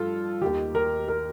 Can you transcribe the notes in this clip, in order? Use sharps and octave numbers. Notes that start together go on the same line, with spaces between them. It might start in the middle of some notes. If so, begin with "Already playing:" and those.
Already playing: G2 F3 F4 A4
D#2 D#3 G4
A#4
A#4